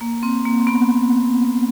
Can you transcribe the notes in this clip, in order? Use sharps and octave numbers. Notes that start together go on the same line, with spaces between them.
A#3
C4
A#3
C4
B3